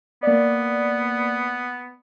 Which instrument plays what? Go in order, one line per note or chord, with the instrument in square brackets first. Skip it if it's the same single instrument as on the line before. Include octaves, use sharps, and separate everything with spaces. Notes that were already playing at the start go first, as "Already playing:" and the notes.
[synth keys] A#3 D5 [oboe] B3